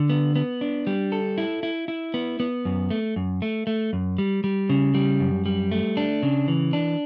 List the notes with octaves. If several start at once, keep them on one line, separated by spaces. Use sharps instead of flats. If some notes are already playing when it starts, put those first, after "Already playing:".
Already playing: D3
B3
B3
D4
G3
A4
E4
E4
E4
B3
B3
F#2
A3
F#2
A3
A3
F#2
G3
G3
C#3
G3
F#2
G3
A3
D4
C#3
E3
D4